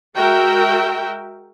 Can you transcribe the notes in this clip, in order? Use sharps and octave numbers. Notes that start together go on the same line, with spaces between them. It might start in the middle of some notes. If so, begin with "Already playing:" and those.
G#3 F#4 A#4 E5 G5